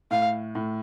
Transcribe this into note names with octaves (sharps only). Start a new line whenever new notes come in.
A2 F5
A2